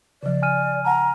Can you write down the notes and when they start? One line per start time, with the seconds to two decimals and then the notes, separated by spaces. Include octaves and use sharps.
0.23 C#3 F3 D5
0.42 G#5 F6 D#7
0.85 F#5 A5 A#5